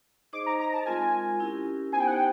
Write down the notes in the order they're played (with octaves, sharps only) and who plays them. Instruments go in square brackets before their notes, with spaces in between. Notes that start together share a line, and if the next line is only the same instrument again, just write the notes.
[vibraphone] D#4 G#4 C5 D#5 [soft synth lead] D6
[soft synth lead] A#5
A#5
A5
[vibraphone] G#3 C4 F4 A#4 [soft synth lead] G#5
[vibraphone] C#4 E4 G4 A#4
[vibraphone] B3 D#4 G4 C5 [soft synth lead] G#5
[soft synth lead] G5
F#5
G5